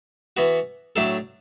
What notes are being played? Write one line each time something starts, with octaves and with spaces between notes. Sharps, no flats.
E3 B3 F#4
A2 F#3 A3 D4 A4